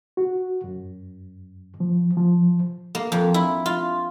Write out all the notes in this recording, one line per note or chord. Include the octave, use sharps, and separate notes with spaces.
F#4
F#2
F3
F3
A#3
F2
E4
F4